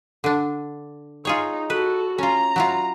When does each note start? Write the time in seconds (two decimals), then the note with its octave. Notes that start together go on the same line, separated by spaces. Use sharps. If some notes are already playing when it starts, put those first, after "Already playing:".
0.24 D3 D4
1.25 D#4 F4 G#4 C#5
1.70 F#4 A4 B4
2.18 C#4 F4 A#5
2.56 F#3 E4 F4